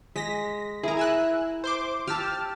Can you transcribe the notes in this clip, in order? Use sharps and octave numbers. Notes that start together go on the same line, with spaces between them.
G#3 A#6 B6
E4 G#4 A#4 A#5
G#5 E6 F#6
C5 C6 D6
G4 A5 E6 F6